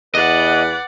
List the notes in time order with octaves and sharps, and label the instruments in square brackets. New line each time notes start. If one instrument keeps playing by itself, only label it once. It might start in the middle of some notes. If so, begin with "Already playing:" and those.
[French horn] E2 [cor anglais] B4 [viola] D5 F#5 [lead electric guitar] D#5